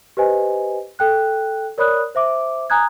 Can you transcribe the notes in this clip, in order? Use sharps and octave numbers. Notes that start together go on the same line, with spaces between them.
G4 B4 C5 D#5 G#5
A4 G5 F#6
A#4 C#5 D5 B5 D#6 F#6
C5 E5 D6
G#5 A#5 D#6 F#6 G#6